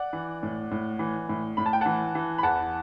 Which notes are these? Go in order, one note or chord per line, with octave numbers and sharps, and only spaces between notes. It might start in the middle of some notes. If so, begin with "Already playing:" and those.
Already playing: D5 F#5
E3
A2
A2
E3
A2
A2 B5
A5
G5
E3 F#5 A5
E3
B5
E2 F#5 A5